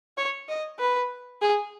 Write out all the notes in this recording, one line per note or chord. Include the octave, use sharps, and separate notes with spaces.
C#5
D#5
B4
G#4